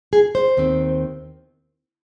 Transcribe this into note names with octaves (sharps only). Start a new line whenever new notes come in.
G#4
C5
D#2 D#3 C4